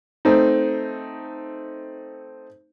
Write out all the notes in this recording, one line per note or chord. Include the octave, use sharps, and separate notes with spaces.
A3 C4 D#4